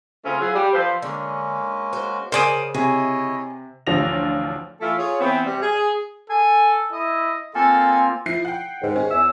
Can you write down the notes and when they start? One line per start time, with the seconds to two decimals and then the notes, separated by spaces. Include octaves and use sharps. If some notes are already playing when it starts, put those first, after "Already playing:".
0.25 C#3 A3 C4 C#4 F4
0.40 F#3 E4 F4 G#4
0.55 G3
0.74 F3 A4 B4 C5
1.02 D3 G#3 A#3 C#4
1.93 F#4 C5
2.32 C#3 A#4 C5 D5 G#5 D#6 D7
2.74 C3 E4 G#4 C#5 D#5
3.87 A1 D2 F3 D4 A#6 F7
4.81 E3 A3 E4 F4 A4
4.98 F4 G#4 C#5
5.20 E3 B3 C4
5.45 C3 G3
5.61 G#4
6.30 A4 G#5
6.92 E4 D#5
7.55 A#3 C4 F4 A4 G#5 C6
8.26 F3 E4 C7
8.45 F#5 G5
8.81 D#2 G#2
8.96 C#4
9.10 E2 E6